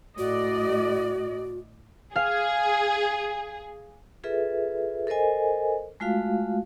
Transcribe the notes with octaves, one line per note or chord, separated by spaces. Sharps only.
A2 F#4 D5 D#5
G#4 F5
F4 G#4 A4 B4 E5
A4 A#4 C5 D#5 G#5
G#3 A3 F4 F#4 F5